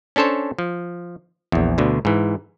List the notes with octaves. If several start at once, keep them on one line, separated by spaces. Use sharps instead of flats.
C#4 D4 A4 C5 C#5
F3
A#1 E2
D2 B2 D3
G#2 E3